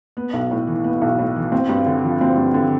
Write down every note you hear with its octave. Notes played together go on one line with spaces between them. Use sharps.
B3
B1
A2
E3
B3
B1
A2
E3
C4
G2
D3
F3
C4
G2
D3